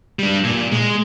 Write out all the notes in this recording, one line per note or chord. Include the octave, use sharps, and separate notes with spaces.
G3 D4
A#2
G#3